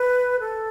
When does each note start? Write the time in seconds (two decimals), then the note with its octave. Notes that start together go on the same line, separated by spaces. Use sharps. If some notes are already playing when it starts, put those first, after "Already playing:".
Already playing: B4
0.40 A4